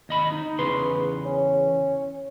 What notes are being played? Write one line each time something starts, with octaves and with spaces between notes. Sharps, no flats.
D#2 D#5 B5
D#4
E2 C#3 B4 C6
C#4